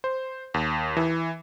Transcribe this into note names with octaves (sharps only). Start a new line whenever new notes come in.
C5
D#2
E3